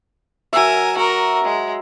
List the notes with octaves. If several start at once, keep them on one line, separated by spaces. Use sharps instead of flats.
F#3 A#4 E5 G#5
F#4 A#4 A#5
G#3